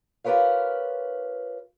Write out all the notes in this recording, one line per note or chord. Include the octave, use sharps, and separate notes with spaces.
F4 G4 A#4 B4 C#5 F5